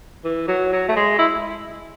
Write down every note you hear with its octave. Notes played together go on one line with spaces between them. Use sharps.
E3
F#3
F#3
A3
G#3
E4